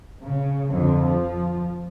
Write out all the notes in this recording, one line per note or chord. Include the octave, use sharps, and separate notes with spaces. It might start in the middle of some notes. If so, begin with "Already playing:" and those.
C#3
F2 D3
F3